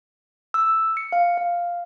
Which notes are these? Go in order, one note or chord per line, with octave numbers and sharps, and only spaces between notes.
E6
C#7
F5
F5